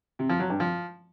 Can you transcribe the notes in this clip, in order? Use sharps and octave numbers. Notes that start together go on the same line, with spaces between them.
C3
F3
F#3
G2
F3